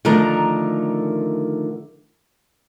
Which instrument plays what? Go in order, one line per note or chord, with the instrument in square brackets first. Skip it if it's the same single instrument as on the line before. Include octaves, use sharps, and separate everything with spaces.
[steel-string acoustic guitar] D3 D#3 F3 A3 A#4 A#5